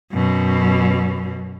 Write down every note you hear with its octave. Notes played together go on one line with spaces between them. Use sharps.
F#2 B2